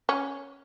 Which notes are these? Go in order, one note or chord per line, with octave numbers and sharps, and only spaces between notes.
C#4